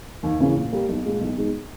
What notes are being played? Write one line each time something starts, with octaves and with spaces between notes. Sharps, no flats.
D#2
C#3 E3 A#3 C#4
A#2
G3 A#3
B1
A#2 G#3
B1
B2 G#3 D#4